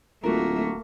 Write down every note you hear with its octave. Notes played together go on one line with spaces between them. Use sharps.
D1 A3 A#3 F4 F#4 A#4